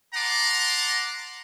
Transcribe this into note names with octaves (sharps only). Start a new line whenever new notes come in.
F#5 A5 A#5 C6 D6